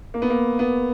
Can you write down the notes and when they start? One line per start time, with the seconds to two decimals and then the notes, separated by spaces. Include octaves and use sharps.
0.14 A#3
0.22 B3
0.30 A#3
0.59 B3